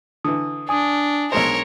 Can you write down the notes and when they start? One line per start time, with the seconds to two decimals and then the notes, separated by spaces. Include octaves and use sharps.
0.24 D3 E3 D#6
0.69 D4 G#5 D#6
1.32 B1 G#3 A#4 C5 C#5